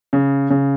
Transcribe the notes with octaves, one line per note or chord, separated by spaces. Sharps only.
C#3
C#3